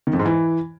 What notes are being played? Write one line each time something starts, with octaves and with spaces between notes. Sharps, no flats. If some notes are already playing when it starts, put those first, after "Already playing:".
D#3
F2
G#2
E3